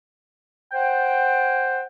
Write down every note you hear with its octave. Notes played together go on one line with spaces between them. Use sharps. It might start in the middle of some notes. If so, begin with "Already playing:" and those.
C5 F#5 G5